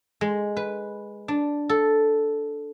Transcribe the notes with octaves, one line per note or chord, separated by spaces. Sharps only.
G#3
B4
D4
A4